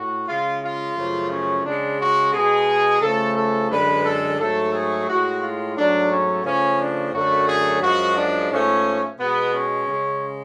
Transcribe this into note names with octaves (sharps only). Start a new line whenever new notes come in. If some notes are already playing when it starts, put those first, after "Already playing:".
Already playing: A2 F#4
C#3 G#3 F4
F4
F#2 C#3 F3 A3
C#4
C#3 G#3 D4
F#4
B2 G#3 G#4
C#3 F3 A3 A4
A4
F#2 D3 G#3 B4
A4
G#2 F#3 A3 A4
G#4
A2 G#3 F#4
F4
G#2 F#3 A3 D4
C#4
C#3 F3 A3 C#4
D4
F#2 D3 F#3 A3 F#4
G#4
F#2 F3 G#3 F#4
D4
G#2 F3 A3 C#4
B2 G#3 B3
C#4
C#3 G#3